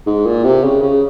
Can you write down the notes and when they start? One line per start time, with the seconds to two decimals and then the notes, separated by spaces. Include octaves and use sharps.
0.06 G#2
0.26 A#2
0.44 C3
0.64 C#3
0.82 C#3